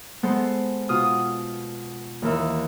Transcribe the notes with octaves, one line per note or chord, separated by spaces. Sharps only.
G#3 B3 A4 C5
B2 F4 D#6 F6
D#2 E3 A#4 E5